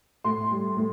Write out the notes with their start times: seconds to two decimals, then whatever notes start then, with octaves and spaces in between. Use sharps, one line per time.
0.24 A2 C6
0.51 G3
0.77 A2